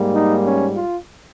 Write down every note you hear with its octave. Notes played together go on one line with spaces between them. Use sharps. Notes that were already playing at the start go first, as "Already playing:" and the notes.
Already playing: G#2 G3 A#3
D#4
C#4
F4